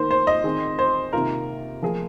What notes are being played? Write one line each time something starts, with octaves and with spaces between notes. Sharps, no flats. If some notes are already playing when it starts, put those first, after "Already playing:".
Already playing: D#3 A#3 C5
C5
D#5
D#3 C4 G#4
C5
C3 D#3 A#3 F4 A#4
F3 A#3 G#4